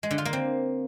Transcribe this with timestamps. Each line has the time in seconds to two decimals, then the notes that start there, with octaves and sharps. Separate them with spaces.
0.03 G#3
0.11 D3
0.18 F4
0.25 A#3
0.33 C4